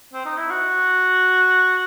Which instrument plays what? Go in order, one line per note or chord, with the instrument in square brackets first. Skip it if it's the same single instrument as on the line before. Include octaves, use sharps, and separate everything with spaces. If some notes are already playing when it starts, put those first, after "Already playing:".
[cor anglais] C4
D#4
E4
F#4